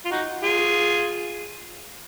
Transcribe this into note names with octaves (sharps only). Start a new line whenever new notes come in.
F4
D#4 F#4
F4 G#4